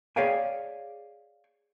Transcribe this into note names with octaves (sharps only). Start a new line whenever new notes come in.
G#4 C#5 D5 F5 G5 G#5